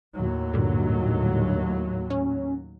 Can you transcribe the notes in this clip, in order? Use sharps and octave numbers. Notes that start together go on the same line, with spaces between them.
D#2 A2 F#3
G2 A#2 D3
C#4